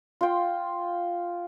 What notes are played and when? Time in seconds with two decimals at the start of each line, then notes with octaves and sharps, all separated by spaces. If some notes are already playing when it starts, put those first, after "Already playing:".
0.21 F4 G5